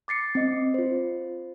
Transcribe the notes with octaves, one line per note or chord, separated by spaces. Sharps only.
D6 A6 C7 C#7
C4 D#5
F4 C5